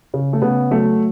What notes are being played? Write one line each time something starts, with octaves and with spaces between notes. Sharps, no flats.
C#3
A3
C#3 B3
F#3 A3